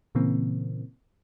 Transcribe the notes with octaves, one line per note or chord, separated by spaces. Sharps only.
A#2 C#3 E3 A#3 C4